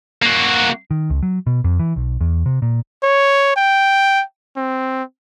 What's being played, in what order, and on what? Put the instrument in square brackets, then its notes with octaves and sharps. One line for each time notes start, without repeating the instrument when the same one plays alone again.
[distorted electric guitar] A#3 F#4
[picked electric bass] D#3
C#2
F#3
B2
F2
E3
B1
E2
C3
A#2
[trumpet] C#5
G5
C4